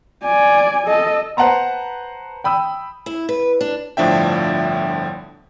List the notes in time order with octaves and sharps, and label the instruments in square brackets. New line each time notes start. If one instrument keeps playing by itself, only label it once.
[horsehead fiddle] D5 G#5
A4 D#5
[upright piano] B4 C5 F#5 A5 A#5 C6
G5 B5 D#6 E6
[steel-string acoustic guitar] E4
B4
D4
[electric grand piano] G1 A2 F3 D4 E5 G5